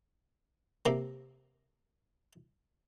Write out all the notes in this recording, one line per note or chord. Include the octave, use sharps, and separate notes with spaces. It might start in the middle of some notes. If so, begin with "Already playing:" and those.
C3 A#3